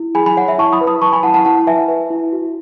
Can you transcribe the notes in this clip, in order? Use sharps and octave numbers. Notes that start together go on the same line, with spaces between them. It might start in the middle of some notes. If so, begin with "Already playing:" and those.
Already playing: E4
G#4 G#5 B5
G#5 B5
C#5 F#5
E5
E4 A5 C#6
B5 D#6
B4
B5 D#6
B4 A5 C#6
G#5 B5
E4 F#5 A5
F#5 A5
E4 F#5 A5
B4 E5 G#5
B4
E4
F#4